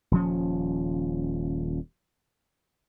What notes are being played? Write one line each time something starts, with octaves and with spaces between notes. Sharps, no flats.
D#1 F3 C#4